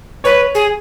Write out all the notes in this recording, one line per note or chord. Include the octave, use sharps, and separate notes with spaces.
B4 C#5
G#4